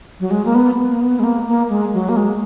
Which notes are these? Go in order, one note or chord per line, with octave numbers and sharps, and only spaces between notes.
F#3
G#3
A#3
B3
A#3
B3
G#3
A#3
A#3
G#3
F#3
A#3
G#3